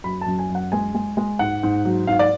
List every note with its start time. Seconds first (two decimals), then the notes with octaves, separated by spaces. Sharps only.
0.04 F#2 B5
0.21 F#2 A5
0.39 G#5
0.50 F#2 F#5
0.72 G#3 G#5
0.94 G#3
1.17 G#3
1.39 G#2 F#5
1.63 G#2
1.85 F#3
2.07 G#2 F5
2.19 D5